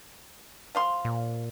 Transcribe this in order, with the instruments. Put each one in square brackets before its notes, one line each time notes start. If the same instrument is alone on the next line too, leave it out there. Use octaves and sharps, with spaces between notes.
[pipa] F3 F5 C6
[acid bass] A#2